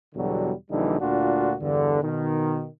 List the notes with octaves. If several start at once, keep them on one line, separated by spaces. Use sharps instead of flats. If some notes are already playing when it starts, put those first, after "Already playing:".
E2 B2 D3 F#3 G3
A#1 D3 E3 G3 D#4
D2 A#2 D4 F4 F#4
E2 G2 D3
B2 D#3